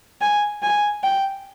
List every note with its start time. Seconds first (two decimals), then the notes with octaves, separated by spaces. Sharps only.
0.21 G#5
0.63 G#5
1.03 G5